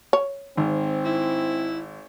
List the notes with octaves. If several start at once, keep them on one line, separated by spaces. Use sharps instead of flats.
C#5
G#1 C4
E4